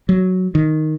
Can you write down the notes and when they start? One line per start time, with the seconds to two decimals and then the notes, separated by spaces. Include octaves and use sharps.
0.09 F#3
0.55 D#3